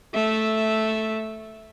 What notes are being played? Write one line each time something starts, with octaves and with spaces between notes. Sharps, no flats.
A3 E5